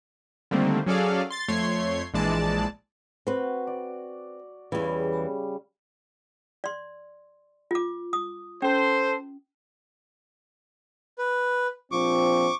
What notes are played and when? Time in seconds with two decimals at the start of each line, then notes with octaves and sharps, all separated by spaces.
0.51 D3 D#3 G3 A3 A#3 C4
0.86 F#3 C#4 G#4 A4 D5 F5
1.30 C6 A6
1.48 F2 A3 C#5 C6 G#6 C7
2.14 A#1 E3 G#3 D5 A5
3.27 C4 F#4 B4
3.67 D5
4.72 E2 C#3 E3 G3
6.64 D5 C6
7.71 F4 D6
8.13 D#6
8.62 C#4 A4 C5
11.19 B4
11.92 A#1 F3 C4 C#6 D6